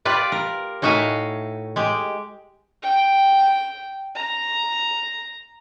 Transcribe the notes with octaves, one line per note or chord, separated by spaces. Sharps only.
F4 G4 B4 D5
A#4
A2 D#4 F#4 E5 F5 G#5
G#3 G4
G5
A#5